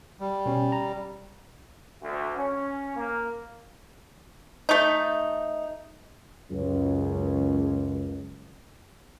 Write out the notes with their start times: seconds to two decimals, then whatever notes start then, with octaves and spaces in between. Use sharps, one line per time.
0.20 G3
0.46 B2 C#4
0.72 A#5
2.01 D2
2.36 C#4
2.95 A#3
4.69 A3 D#4
6.51 C#2 F#2